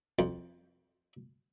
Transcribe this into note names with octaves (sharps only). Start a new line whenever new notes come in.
F2